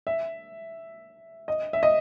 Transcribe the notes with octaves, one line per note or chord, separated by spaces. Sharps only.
E5
D#5
E5
D#5